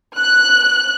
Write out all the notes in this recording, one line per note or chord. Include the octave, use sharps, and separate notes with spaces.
F#6